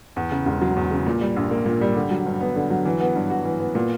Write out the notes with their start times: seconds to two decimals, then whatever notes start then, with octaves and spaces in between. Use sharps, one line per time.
0.16 E2
0.31 C#3
0.46 E1
0.61 F#3
0.76 E2
0.91 C#3
1.06 A#2
1.21 G3
1.36 A#1
1.51 A#3
1.66 A#2
1.81 G3
1.96 D3
2.11 F#3
2.26 G2
2.41 B3
2.56 D3
2.70 F#3
2.85 E3
3.01 B3
3.15 G2
3.30 F#4
3.45 E3
3.60 B3
3.75 A#2